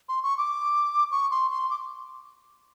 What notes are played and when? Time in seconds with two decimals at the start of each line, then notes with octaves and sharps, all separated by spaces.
0.09 C6
0.23 C#6
0.38 D6
1.11 C#6
1.31 C6
1.51 C6
1.70 D6